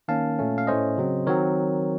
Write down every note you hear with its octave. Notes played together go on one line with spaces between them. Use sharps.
D#3 A#3 C#4 F5 A5
A#2 A3 C#4
F5
A2 A3 C#4 C5 D#5
C#3 F#3 C4
D#3 F#3 C4 A#4 C#5